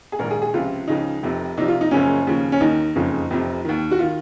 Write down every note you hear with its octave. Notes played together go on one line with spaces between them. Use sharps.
G#4
A#1 G#2 D#3 A#4
G#4
G#4
C#2 C3 F3 F4
C#2 C#3 F3 D#4
F1 F2 C3 F3
C2 C3 F3 D#4
F4
D#4
F#1 F#2 C#3 F3 C#4
D#2 C#3 F3
C#4
D#2 D#3 D#4
F#1 F2 C#3 F3
F1 F2 C3 F3
D#2 D#3
F#4
D#3 F4